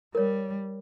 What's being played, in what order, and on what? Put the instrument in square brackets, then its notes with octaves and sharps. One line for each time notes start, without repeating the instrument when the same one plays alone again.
[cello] G3 [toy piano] A#4 C#5